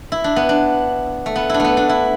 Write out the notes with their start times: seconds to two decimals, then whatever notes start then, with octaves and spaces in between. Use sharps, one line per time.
0.12 E4
0.24 D4
0.36 B3
0.49 D4
1.26 A3
1.36 B3
1.49 D4 E4
1.60 A3 B3
1.77 D4
1.89 E4